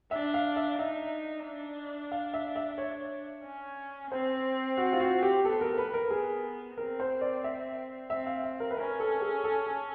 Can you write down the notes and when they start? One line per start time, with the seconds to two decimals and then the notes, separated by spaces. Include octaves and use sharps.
0.11 D4 E5
0.34 F5
0.56 E5
0.79 D#4 E5
1.45 D4
2.12 F5
2.34 E5
2.56 E5
2.78 C#5
3.45 C#4
4.11 C4 C5
4.77 F#4
4.93 F4
5.00 F#4
5.23 G4
5.44 B3 A4
5.61 A#4
5.78 B4
5.94 A#4
6.10 B3 G#4
6.77 C4 A#4
7.00 C5
7.21 D5
7.44 E5
8.10 C4 E5
8.27 F5
8.43 E5
8.60 A#4
8.71 B4
8.77 C#4 A#4
9.00 A4
9.21 G#4
9.44 A4
9.66 A4